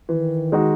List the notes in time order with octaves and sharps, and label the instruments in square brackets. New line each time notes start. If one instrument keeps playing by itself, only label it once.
[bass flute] D#3 [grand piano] E3
[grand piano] G#3 D#4 F#4